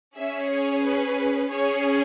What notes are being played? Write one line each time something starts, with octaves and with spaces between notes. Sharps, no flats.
C#4 G#4 E5
C#5
B4
C#4 G#4 C#5